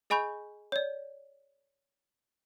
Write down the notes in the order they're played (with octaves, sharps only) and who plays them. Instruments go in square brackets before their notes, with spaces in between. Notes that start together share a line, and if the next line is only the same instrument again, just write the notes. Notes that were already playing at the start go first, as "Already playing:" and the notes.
[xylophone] G#4 D#5 G#5 B5 C#6 G6
C#5 D5